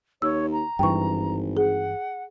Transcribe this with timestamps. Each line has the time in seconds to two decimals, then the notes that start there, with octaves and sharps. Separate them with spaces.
0.22 D#2 C#5 E6
0.52 A#5
0.79 G#1 G2 E3 G5 C#6
1.57 G#4 F#5